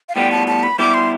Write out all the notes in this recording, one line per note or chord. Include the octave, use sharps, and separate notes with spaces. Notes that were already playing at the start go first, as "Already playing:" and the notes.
F5
A2 G3 B3 G5
A5
A5
B5
G3 B3 E4 G4 D6
C6